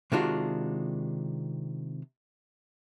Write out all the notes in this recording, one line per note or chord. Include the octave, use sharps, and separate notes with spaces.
C3 D#3 G#3 D4 F4 F#4